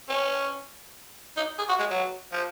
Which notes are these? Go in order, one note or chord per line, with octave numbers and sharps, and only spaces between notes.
C#4
D#4
G#4
F#4
G#3
F#3
F3